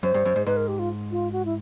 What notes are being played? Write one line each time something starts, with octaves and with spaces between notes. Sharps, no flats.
F#2 C5
G2
F#2
G#2
G#2 B4
A#4
G4
F4
F4
F#4
E4